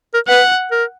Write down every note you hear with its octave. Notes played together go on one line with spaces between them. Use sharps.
A#4
B4 F#5
A#4